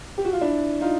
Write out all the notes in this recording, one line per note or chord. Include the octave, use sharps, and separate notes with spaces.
G4
F#4
F4
D4 E4
D#4 F4